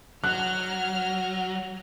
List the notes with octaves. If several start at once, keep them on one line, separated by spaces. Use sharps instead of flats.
F#3 F#5 F6 F#6